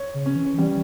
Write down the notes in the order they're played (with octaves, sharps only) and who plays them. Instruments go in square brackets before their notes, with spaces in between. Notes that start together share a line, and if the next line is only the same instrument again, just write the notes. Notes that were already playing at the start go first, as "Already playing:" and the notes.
Already playing: [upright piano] C#5
[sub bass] C#3
[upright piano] C#4
[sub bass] E3
[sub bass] E3 [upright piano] G3